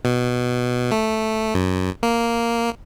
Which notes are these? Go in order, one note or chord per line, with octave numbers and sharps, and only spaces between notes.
B2
A3
F#2
A#3